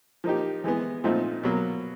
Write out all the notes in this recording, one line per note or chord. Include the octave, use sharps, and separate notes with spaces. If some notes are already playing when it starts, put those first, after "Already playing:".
F3 A#3 D#4 G4
E3 G#3 B3
A#2 F3 A3 C4 D#4
B2 F#3 A#3